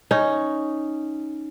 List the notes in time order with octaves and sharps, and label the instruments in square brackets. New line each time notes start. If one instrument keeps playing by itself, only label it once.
[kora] C#4 D#4